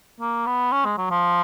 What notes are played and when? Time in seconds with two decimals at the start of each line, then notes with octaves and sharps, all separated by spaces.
0.20 A#3
0.47 B3
0.72 C#4
0.85 G#3
0.97 F#3
1.10 F3